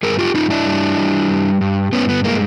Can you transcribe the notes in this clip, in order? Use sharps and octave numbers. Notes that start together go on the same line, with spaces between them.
G2 G#4 A#4
F4 G4
G2 D#4 F4
D4 E4
G3
G3
G2
G2
G2 B3 C#4
B3
G#3 A#3